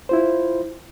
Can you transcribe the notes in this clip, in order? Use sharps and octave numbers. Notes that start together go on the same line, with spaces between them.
E4 F4 C5